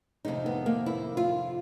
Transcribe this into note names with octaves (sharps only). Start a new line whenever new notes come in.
F2 C3 D#3 G#3 D#4
B3
A#3
E4
F4